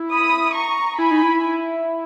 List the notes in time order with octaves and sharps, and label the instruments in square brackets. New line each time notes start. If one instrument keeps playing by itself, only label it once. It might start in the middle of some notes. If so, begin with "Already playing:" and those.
Already playing: [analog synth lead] E4
[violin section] B5 D#6
A#5 C#6
[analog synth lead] E4 [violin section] G#5 B5
[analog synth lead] D#4
E4